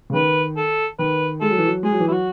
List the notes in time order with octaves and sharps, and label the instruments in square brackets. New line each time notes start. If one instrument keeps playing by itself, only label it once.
[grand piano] C#3
[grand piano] D#3 [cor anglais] B4
[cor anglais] A4
[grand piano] D#3 [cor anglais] B4
[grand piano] G#3 [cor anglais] A4
[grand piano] F#3
E3
F#3
[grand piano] G#3 [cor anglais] G#4
[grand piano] F#3
E3
[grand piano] F#3 [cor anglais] E4 F#4